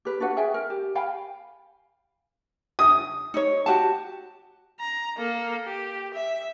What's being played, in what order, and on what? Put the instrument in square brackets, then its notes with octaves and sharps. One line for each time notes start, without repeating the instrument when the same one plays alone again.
[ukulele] G4 B4
D4 F#4 B4 F#5
G#4 E5 G5 G#5
A#4
G4
F5 G5 G#5 B5
[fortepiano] D#6
[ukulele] D#4 C#5
F#4 G4 A5
[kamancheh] A#5
A#3 A4
G4
E5